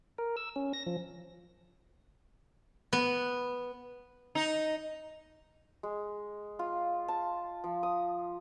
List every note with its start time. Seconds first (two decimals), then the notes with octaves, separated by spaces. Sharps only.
0.18 A#4
0.37 E6
0.56 C#4
0.73 A#6
0.86 F3
2.93 B3
4.35 D#4
5.83 G#3
6.59 F4
7.08 A5
7.64 F3
7.83 D#6